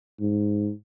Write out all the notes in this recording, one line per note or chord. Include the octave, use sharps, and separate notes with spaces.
G#2